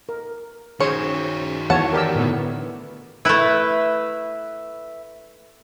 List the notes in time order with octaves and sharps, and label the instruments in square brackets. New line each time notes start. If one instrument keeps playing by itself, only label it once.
[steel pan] A#4
[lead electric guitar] D#3 F#4 [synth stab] C#4 G#4 C5 [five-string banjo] C#5
[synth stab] E2 E3 [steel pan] C#5 A5 [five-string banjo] F#5
[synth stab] G4 [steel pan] A#4 D5 E6
[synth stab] A2 D3 B3
[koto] A3 E4 [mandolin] B4 E5